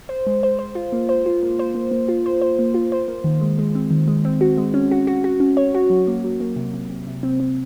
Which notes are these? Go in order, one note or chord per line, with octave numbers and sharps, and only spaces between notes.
C5
G#3
C5
C5
F4
A#3
C5
F4
A#3
C5
A#3
A#3
F4
C5
C5
A#3
F4
C5
A#3
D#3
G#3
G#3
C4
D#3
G#3
C4
F#4
G#3
C#4
F#4
F#4
F#4
C#4
C#5
F#4
F#3
A#3
F#3
A#3
C3
C3
C3
C3
C4
C4